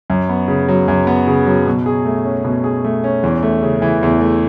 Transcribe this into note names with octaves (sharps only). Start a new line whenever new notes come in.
F#2
B3
C#3
F#3
F#2
B3
C#3
F#3
B2
G#4
A3
C#4
B2
G#4
A3
C#4
E2
A3
C#3
E3
E2
A3